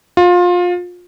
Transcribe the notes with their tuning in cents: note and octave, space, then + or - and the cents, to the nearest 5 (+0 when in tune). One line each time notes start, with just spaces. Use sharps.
F4 +25